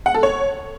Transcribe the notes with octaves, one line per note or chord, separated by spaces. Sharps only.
F#5
A4
C#5